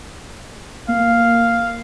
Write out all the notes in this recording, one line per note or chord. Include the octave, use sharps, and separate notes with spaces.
A#3 F5